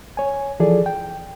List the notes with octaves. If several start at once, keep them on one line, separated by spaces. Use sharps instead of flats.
C#5 G#5
E3 F3 G#4 A4 D5
G5